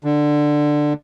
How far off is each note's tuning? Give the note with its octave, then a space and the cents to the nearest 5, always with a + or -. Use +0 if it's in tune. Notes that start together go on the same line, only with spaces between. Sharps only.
D3 +10